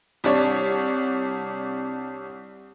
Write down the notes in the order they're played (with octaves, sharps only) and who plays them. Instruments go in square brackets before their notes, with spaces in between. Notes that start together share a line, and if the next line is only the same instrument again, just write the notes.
[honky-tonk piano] C2 D4 C#5